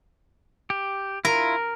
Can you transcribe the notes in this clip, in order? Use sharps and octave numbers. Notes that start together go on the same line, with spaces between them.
G4
E4 F4 A#4